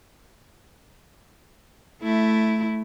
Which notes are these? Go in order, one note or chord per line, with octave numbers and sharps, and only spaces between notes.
A3 E4